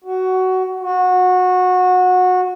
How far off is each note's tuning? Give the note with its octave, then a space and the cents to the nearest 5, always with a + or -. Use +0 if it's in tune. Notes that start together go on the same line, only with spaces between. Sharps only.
F#4 +15
F#4 -20